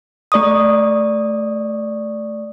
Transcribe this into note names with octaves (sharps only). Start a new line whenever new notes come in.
A3 D5 C#6 D#6